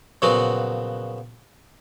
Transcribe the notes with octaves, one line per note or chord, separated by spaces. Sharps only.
A#2 C#3 F3 F#3 B3 F#4